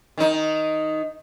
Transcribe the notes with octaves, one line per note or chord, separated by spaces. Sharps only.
D#3 D#4